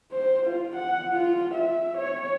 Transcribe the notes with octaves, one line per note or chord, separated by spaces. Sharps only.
C5
F4
F#5
F4
E5
C#5